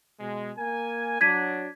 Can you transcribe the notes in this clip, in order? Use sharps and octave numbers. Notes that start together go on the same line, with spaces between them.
B2 G#3
A#3 A#4 G#5
F#3 D4 G#6 B6 D#7